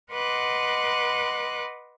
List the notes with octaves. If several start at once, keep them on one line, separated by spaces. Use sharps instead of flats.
B4 D#5 F#5 C6 D6 F#6